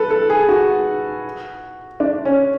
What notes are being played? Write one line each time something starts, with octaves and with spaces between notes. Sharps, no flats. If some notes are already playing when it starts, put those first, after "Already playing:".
Already playing: A4 B4
A4
G#4
F#4
D4
C#4